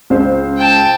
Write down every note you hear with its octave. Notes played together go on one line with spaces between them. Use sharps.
C#2 C5
G5 A5